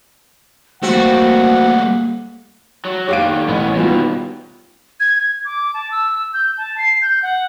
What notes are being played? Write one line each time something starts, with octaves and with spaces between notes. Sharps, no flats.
G3 A3 A#3 C4 F#4 F#5
F#3
D#2 D3 G4 F5 D7
A1 B3 C#4
D#2 B2 G3 B3 F4
G#6
G#6
D6
A5
E6
G6
A5
C7
G6
F#5